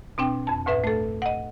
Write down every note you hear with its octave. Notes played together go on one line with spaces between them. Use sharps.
B2 C4 D4 G5
F2 A5
D2 A2 B4 E5
A3 A4
D#5 F#5